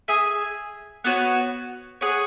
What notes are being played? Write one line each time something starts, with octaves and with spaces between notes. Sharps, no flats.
G#4 E5 G#5
B3 F#4 C#5
G#4 C#5 F#5